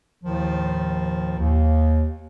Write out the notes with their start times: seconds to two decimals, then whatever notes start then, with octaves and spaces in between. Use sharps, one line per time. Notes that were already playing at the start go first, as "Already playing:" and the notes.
0.23 D#2 A2 D#3 F3
1.39 D#2